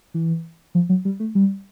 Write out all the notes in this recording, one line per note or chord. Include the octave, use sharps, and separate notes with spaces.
E3
F3
F#3
G3
A3
G3